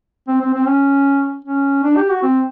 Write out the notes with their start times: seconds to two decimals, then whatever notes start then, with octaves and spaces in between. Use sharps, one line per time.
0.28 C4
0.41 C4
0.54 C4
0.67 C#4
1.45 C#4
1.84 D4
1.97 G4
2.09 F#4
2.23 C4